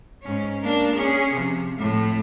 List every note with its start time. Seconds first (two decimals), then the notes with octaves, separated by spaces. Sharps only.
0.22 G#2 C#4
0.63 A#3 D4
0.95 C#4 G#4
1.34 C3 F3
1.77 F2 A2